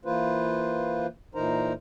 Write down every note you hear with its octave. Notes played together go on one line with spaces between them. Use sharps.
E3 A#3 F4 B4 C5
A#2 E3 D#4 A#4 C5 A#5